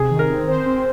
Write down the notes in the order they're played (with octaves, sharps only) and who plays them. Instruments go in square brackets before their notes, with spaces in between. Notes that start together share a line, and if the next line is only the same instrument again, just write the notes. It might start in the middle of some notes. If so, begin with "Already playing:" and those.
Already playing: [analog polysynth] C3 [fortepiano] G#4
[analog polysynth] D#3
[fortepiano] A#4
[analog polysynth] C4
C5
C4